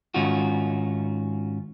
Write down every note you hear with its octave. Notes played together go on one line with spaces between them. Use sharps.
G#2 D#3 C#4 D#4 F4 F#4